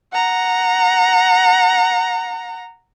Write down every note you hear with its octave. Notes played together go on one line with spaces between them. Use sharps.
F#5 A#5